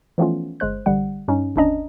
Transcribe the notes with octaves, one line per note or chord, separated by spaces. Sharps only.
E3 F3 A3 B3 C#4 F4
G1 G#3 C5 F#6
A1 D3 G3 F#5
G2 C#4 D#4
G1 D#2 C#4 D4 D#5 A#5